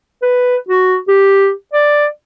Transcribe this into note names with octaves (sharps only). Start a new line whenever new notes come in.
B4
F#4
G4
D5